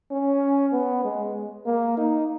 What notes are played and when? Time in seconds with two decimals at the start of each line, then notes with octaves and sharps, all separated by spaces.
0.11 C#4
0.72 B3
1.05 G#3
1.66 A#3
1.97 D#4